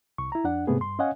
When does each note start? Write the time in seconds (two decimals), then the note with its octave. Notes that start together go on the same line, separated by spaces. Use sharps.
0.18 C2 C#6
0.32 E4 A#5
0.44 F2 D4 F#5
0.67 G#2 C3 A3 B3 G#4
0.80 G2 C6
0.99 C#4 C#5 D#5 F5 F#5 G#5